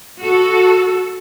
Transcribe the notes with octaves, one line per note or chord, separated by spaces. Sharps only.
F#4 A4